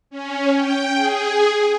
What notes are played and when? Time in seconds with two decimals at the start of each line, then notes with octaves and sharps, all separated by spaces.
0.10 C#4
0.56 G5
0.95 G#4